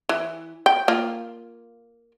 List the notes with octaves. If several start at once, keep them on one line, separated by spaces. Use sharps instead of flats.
E3
G5
A#3 F4